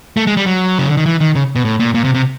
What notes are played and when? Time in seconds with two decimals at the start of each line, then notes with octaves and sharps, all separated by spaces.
0.17 A3
0.27 G#3
0.37 G3
0.46 F#3
0.79 C#3
0.88 D3
0.97 D#3
1.06 E3
1.20 D#3
1.35 C#3
1.56 B2
1.65 A2
1.80 A#2
1.94 A#2
2.04 C3
2.14 C3